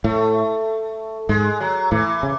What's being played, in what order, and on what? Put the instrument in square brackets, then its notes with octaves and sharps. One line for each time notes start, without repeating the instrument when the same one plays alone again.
[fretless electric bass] A2 [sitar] A3
[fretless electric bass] G#2 [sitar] G#3
[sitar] F#3
[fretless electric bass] A2 [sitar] E3
[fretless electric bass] C#3